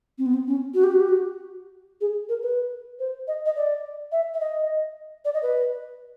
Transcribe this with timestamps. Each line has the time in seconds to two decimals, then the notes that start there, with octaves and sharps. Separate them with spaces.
0.18 C4
0.26 B3
0.34 C4
0.47 C#4
0.74 F#4
0.84 G4
0.91 F#4
1.00 G4
1.09 F#4
2.01 G#4
2.29 A#4
2.43 B4
2.99 C5
3.28 D#5
3.46 D#5
3.56 D5
4.12 E5
4.34 E5
4.40 D#5
5.25 D5
5.34 D#5
5.43 B4